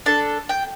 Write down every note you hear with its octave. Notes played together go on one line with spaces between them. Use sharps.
D4 A4 A5
G5